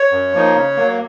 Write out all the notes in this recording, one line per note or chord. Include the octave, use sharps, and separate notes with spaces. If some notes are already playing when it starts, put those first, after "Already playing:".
Already playing: C#5
F#2
F3 A#3 D#4
C#3
F#3 A#3